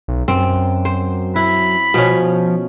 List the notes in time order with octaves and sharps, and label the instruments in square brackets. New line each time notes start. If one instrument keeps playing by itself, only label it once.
[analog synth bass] B1
[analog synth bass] F#2 [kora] C4
[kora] C5
[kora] E4 [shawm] B5
[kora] B2 C#4 [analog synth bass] F3